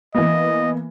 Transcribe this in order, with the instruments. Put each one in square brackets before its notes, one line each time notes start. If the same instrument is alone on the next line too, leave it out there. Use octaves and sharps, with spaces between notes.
[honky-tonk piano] E3 A#3 B3 [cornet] D#5